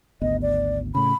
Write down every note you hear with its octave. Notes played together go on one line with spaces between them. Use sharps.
G#1 D2 B3 D#5
D5
A2 C#3 B5